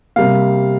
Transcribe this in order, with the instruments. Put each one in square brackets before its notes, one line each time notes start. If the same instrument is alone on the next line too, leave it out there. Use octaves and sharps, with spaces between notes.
[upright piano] C3 G3 A#3 F5